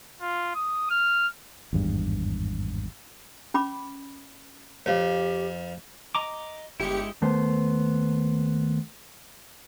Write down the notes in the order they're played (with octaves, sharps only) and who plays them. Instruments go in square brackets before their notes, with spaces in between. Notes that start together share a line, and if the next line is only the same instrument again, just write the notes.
[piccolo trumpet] F4
D#6
F6
[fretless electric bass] G#1 E2 G2
[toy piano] C#4 B5 D6
[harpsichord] F2 [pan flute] G4 [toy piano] C#5 F5
[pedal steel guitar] D#5 A#5 D6
[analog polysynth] G1 G4 C#7 [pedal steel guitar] G#3 E4
[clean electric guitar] D#2 A3 B3 C5